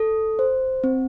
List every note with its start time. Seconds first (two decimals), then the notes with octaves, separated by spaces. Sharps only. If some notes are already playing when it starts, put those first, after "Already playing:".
Already playing: A4
0.39 C5
0.84 C4